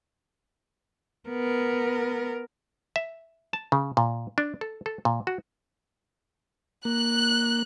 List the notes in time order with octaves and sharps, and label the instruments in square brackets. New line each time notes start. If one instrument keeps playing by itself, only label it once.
[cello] B3 A#4
[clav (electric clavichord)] E5
A5
C#3
A#2
D4
A4
A4
A#2
F#4
[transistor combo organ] A#3 [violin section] F#6